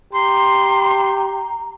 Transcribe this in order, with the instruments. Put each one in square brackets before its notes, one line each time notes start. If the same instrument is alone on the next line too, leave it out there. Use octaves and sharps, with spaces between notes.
[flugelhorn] G4 [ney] A#5 [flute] C6